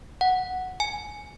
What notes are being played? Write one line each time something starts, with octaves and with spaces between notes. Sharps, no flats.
F#5
G#5